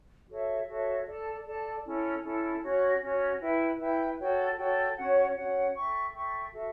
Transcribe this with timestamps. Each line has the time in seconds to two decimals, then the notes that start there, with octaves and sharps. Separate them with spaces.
0.28 F#4 A4 C#5 E5
0.67 F#4 A4 C#5 E5
1.07 A4 D5 A5
1.46 A4 D5 A5
1.85 C#4 E4 A4
2.24 C#4 E4 A4
2.63 C#4 F#4 C#5
3.01 C#4 F#4 C#5
3.41 E4 B4 E5 G5
3.79 E4 B4 E5 G5
4.19 F#4 A4 C#5 G5
4.57 F#4 A4 C#5 G5
4.97 C#4 F#4 C#5 F#5
5.36 C#4 F#4 C#5 F#5
5.75 A4 E5 G5 C#6
6.13 A4 E5 G5 C#6
6.52 F#4 A4 E5